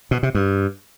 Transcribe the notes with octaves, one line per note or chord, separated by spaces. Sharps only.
B2
C3
G2